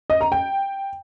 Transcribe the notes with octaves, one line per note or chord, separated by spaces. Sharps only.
D#5
A#5
G5